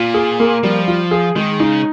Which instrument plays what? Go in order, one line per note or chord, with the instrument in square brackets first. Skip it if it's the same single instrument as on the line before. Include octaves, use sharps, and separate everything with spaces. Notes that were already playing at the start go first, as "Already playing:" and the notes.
Already playing: [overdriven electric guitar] A#2 [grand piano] F4
[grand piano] G#4
A#3
[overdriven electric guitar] F3 [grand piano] G3
[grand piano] F4
G#4
[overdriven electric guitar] D#3 [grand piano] G#3
[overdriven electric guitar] C#3 [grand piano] D#4